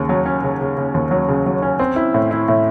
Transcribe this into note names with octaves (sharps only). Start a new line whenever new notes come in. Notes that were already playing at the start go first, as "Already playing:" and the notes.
Already playing: D#2 C#3
F#3
C#4
C#3
C#3
C#3
D#2
F#3
C#3
F#3
C#4
C4
E4
A2
E4
A2